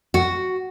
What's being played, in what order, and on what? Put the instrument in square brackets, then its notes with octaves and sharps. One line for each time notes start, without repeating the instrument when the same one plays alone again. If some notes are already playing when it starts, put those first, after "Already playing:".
[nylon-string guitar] F#4